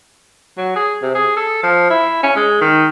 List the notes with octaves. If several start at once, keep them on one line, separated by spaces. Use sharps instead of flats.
F#3
G#4
C3
G#4
A4
F3
E4
C#4
G#3
D#3